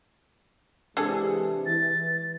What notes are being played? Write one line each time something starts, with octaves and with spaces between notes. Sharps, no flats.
C3 E3 G#3 D4 G#4 A4
E3 A6